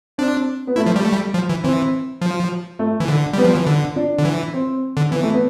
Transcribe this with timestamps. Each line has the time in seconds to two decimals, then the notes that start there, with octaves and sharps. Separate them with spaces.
0.18 C4 D4
0.67 B3
0.76 A3 E4
0.86 F3
0.96 G3
1.05 A3
1.12 G3
1.34 F3
1.49 E3
1.63 E3 C4
2.22 F3
2.79 A3
3.00 E3
3.08 D3
3.34 G3 B3
3.44 F3
3.55 E3
3.67 D3
3.96 D4
4.19 D3
4.25 E3
4.54 C4
4.97 D3
5.11 E3 B3
5.23 A3
5.34 B3